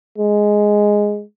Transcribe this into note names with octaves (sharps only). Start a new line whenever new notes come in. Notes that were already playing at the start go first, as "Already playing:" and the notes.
G#3